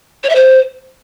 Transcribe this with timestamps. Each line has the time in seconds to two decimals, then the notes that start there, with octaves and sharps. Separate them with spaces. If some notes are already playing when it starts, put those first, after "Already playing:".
0.24 C#5
0.29 E5
0.35 C5